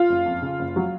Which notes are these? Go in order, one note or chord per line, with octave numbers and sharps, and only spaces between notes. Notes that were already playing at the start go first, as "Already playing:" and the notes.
Already playing: F4
F#1
F2
C#3
F#1
F#3